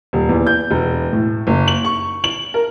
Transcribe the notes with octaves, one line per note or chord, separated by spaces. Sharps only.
D#1
E2
G6
E1
A2
F#1
F#7
C#6
F#7
A#4